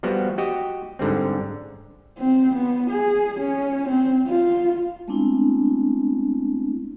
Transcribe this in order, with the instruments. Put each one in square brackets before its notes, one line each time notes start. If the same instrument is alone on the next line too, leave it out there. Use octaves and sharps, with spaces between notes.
[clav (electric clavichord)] F3 G3 B3 F#4
F#4 G4 D#5
G#2 D3 G3 C4
[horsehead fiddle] C4
B3
G#4
C#4
C4
F4
[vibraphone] G#3 A3 B3 C4 D4 E4